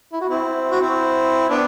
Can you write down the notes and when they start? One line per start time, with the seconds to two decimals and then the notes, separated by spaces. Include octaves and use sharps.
0.13 E4
0.21 F#4
0.29 C4 E4
0.71 F#4
0.80 C4 E4
1.49 B3 D4